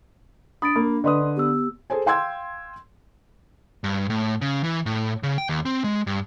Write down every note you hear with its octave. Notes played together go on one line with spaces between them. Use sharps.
D4 B5 D#6 A6 D7
A#3 B5
D3 B4 D5 D#5 C6 D#6
B3 G4 E6
G#4 A4 C5 G#5
F5 G5 C6 E6 G#6
G2
A2
C#3
E3
A2
C#3
G5
D#2
C4
G#3
G2